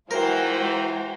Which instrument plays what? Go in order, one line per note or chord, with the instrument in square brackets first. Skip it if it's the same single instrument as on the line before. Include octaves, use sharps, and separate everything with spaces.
[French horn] E3 [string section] G#3 F4 F#4 [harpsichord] A#4 [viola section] C5 G5 A#5